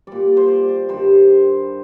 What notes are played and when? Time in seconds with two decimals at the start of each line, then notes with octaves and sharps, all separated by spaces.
0.07 A#2 G3 D5
0.37 C5
0.48 D5
0.69 D5
0.89 G2 D#3 G3 C5